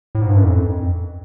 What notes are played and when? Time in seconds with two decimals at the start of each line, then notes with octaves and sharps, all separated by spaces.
0.15 A2
0.22 G#2
0.29 G2
0.36 F#2
0.43 F2